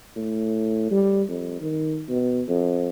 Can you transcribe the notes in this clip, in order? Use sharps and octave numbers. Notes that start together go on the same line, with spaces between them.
A2
G3
F2
D#3
B2
F2